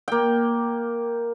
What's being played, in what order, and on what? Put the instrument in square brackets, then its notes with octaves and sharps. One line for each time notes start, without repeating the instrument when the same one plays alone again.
[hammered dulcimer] A#3 G5